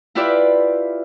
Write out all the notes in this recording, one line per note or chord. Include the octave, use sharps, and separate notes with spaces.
E4 F4 G4 B4 D5 E5